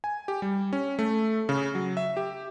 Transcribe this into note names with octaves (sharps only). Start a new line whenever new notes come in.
G#5
G4
G3
C#4
A3
C#3
F#3
E5
G4